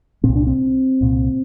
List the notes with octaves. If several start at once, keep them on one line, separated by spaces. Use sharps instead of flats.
C2 A#2 C4
D4
C4
C2 A#2